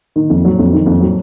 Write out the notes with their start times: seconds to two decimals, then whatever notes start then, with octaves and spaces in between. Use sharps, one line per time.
0.16 D#3
0.30 F2
0.45 F#3
0.59 F2
0.73 D#3
0.86 F2
1.01 F#3